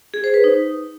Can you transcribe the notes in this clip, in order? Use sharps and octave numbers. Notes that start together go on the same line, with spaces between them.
G#4
C5
B4
D#4